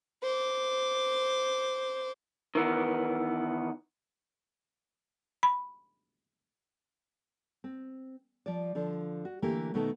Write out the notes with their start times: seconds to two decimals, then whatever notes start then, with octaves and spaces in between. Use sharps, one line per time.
0.23 C5 D6
2.55 D#3 E3 B3
5.43 B5
7.64 C4
8.46 F3 D5
8.75 D3 F3
9.25 F#4
9.42 D3 E3 A3 A#3 G4
9.74 B2 D#3 A3 B3 D#4 A4